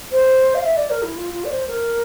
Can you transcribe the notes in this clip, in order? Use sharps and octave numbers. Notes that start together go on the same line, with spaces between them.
C5
F5
E5
D5
A#4
E4
F4
F4
D5
C5
A#4